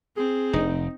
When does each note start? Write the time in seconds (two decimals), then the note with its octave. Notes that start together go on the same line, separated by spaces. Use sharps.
0.17 C4 G#4
0.53 F1 D#4